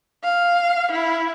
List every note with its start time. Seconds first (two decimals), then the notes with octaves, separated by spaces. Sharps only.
0.23 F5
0.91 E4